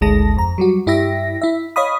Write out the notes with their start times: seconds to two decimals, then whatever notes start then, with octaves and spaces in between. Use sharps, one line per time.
0.01 G#1 D2 G#3 A5 A#6
0.37 F2 A#5
0.58 F#3 G3 F#4
0.87 G2 E4 G4 E5 A#6
1.42 E4 E5
1.76 C#5 D#5 F5 B5 D#6